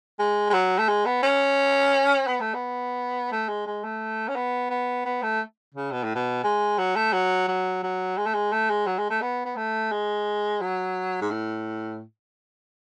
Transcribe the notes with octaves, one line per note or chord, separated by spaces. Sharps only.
G#3
G#3
F#3
A3
G#3
B3
C#4
B3
A3
B3
A3
G#3
G#3
A3
C#4
B3
B3
B3
A3
C#3
B2
A2
B2
G#3
F#3
A3
F#3
F#3
F#3
G#3
A3
G#3
A3
G#3
F#3
G#3
A3
B3
B3
A3
G#3
F#3
G#2
A2